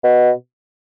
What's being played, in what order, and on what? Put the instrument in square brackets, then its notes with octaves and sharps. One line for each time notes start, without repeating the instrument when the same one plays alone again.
[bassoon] B2